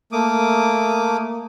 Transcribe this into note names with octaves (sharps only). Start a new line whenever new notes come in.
A3 A#3 D6 D#6